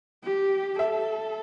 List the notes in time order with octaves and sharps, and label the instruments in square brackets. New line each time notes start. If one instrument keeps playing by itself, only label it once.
[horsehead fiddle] G4
[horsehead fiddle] A4 [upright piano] E5